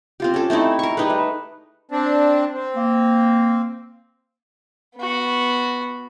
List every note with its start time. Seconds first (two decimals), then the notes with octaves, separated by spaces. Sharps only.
0.20 C4 F4 G4
0.34 C#4 A4
0.50 A3 C4 D#4 E4
0.79 A#4 C#6
0.97 G3 D#4 G#4 B4
1.10 A3
1.91 C4 D4
2.53 C4
2.76 A#3
4.97 B3 F#4